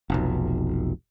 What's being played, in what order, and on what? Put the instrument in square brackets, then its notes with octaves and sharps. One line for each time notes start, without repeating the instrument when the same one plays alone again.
[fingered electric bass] F1 B1